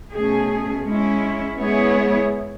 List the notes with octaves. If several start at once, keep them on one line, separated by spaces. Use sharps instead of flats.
B2 A3 C#4 G#4
G#3 C#4 E4
G#3 B3 E4 G#4 C#5